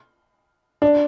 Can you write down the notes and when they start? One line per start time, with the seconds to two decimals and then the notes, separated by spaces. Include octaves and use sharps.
0.82 D4